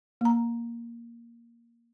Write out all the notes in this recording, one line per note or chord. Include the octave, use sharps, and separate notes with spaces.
A#3 A#5